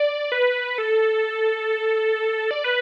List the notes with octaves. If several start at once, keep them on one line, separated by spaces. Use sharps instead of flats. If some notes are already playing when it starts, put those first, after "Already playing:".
Already playing: D5
B4
A4
D5
B4